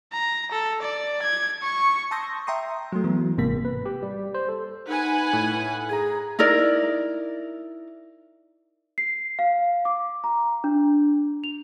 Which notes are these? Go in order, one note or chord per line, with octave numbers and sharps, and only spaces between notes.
A#5
A4
D5
G#6
C#6
A5 C6 D#6 E6 G6 A#6
E5 G5 A#5 C6 D#6
F#3 A3
E3 F#3 B3
G#1 G#2 C3 A#3 B6
B4
G4
G3
C5
A4
D#4 B4 F#5 G#5
A2
G#4 A#5 G#6
D#4 E4 A#4 D5
C7
F5
D6
A#5
D4
F7